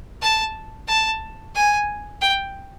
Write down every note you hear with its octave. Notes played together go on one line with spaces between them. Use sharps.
A5
A5
G#5
G5